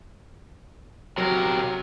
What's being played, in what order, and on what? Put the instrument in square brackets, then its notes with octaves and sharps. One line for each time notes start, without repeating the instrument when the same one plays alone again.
[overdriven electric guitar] C3 A#4 [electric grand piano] F#3